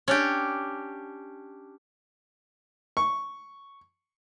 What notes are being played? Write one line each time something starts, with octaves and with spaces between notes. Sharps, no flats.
C#4 D4 G4
C#6